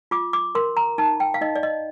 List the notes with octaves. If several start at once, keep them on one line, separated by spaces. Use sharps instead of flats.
F4 D6
D6
A#4 C6
A#5
D#4 A5
G5
F5
D#4 D#5
D5
D#5